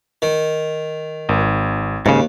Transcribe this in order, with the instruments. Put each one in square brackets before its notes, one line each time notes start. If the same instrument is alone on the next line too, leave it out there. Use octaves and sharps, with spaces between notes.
[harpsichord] D#3
[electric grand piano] G#1
[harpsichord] D#2 [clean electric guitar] G#2 C#3